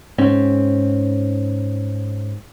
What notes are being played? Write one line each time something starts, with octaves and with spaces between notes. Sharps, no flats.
G#2 C4 C#4